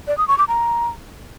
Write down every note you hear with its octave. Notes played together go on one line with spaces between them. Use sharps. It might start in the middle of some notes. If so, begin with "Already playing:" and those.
D5
D#6
C#6
D6
A#5